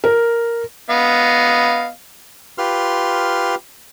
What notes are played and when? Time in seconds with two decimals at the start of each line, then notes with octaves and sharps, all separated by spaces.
0.04 A#4
0.90 B3 D#5 F5
2.58 F4 G4 B4 C6 F6